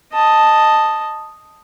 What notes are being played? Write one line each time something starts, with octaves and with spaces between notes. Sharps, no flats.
D#5 A5